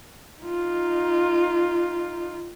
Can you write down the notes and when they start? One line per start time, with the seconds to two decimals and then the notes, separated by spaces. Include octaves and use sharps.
0.42 D#4 F4